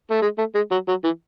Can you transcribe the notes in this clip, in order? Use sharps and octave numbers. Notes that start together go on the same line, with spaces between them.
A3
G#3
A3
G#3
F#3
F#3
E3